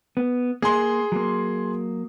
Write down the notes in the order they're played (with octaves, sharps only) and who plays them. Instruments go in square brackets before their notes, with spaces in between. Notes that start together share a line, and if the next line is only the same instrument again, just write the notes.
[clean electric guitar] B3
[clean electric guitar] A#3 [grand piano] G#4 C6
[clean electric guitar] F#3 A#3